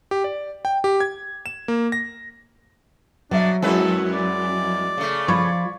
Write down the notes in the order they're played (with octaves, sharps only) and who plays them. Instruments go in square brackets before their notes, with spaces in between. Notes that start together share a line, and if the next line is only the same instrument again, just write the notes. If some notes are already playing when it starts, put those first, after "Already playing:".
[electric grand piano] G4
D5
G5
G4
G#6
E7
A#3
A#6
[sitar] B2 [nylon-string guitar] F#3 E5 [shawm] D4
[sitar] F2 B3 B4 [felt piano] G#3 E4 F#4 [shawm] A4
[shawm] D5
[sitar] C#3 A3
[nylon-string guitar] F3 F4 [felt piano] B5 C#6 G#6